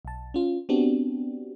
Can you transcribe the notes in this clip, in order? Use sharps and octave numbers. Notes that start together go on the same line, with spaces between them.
B1 A5
C#4 F4
B3 C4 D4 F#4 G4